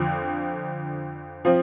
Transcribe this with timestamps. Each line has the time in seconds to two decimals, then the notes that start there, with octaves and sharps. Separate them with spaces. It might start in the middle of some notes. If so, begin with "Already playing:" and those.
Already playing: F2 D3 F3
1.45 F3 C4